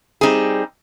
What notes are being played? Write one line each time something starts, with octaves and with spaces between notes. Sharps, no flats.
G3 C4 D#4 G#4